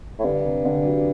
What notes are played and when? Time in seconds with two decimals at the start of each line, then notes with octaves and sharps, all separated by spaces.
0.19 A2
0.24 G2 D3
0.45 C3
0.65 D3
0.85 F#3